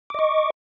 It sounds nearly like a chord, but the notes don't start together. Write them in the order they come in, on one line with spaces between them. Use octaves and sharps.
D6 D#5 C#6